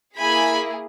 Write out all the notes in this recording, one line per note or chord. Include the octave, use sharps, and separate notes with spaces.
A#3 E4 G#4 G#5 B5